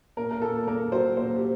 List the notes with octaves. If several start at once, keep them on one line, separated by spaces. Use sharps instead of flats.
A#2 A#4
A#4
A#2 A4
A#3 A#4
F#3 C5
A#2 C5
G4